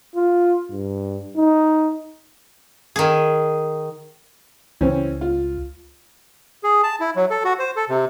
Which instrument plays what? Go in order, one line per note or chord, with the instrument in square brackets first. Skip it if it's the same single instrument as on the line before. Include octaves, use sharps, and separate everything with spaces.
[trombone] F4
G2
D#4
[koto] D#3 G#4
[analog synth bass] C#2 [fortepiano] E3 C4 C#4
[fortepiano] F4
[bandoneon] G#4
A5
E4
F#3
A4
F#4
C5
A4
C3